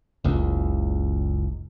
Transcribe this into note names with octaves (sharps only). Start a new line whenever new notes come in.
F#1 C#2